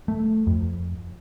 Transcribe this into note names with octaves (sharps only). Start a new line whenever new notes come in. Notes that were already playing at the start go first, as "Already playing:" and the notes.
A3
F2